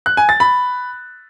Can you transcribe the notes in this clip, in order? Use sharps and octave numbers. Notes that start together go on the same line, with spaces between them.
F#6
G#5
A6
B5